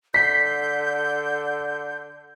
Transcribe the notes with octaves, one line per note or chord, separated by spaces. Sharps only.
D3 G6 B6 C7